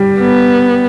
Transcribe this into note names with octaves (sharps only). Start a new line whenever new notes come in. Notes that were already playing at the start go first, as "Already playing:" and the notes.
Already playing: G3
B3